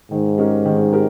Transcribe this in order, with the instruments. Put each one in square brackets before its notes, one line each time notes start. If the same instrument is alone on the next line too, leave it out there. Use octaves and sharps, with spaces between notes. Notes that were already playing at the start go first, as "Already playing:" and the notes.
[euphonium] G#2 [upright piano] D#3
[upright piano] G#3 C#4 G4 A#4
D#3
G4 A#4